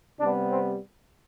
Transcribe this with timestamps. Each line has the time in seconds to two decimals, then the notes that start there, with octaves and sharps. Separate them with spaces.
0.20 C3 G3 B3 D4
0.49 C4